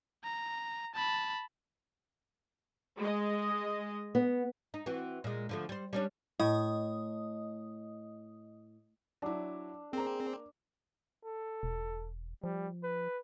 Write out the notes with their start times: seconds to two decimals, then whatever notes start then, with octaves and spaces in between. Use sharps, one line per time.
0.24 A#5
0.95 A5 B5
2.99 G#3 D#5
4.15 B3
4.74 D#4
4.86 E3 C4 F#4
5.24 A#2 G#3
5.49 D3 F3 A3
5.69 G3 C5
5.93 G3 C#4 D4
6.40 A2 D#5 D#6
9.22 F#3 D4 E4
9.93 A#3 C4 G#4 A#5
11.24 A4
11.63 E1
12.44 F3 G3
12.83 B4